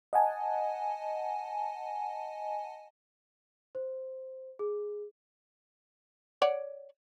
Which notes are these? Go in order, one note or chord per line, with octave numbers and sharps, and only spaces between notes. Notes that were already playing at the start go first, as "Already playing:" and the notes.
D#5 F#5 G#5 A5
C5
G#4
C#5 D5 F#5